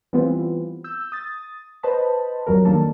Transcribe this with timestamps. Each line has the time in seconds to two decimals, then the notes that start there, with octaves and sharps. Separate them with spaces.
0.13 E3 G3 B3 C4 F4
0.84 E6 G6
1.12 D#6 A6
1.83 B4 C5 D#5 A5 B5
2.47 F2 F#3 G3 A#4
2.65 D#3 A#3 D4 A4